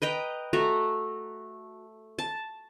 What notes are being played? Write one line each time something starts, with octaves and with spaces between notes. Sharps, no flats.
B4 D#5 G5 A#5
A3 F#4 A#5
A5